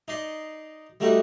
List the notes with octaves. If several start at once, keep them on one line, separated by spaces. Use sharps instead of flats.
D#4 D5 C6
G3 A3 D#4 F#4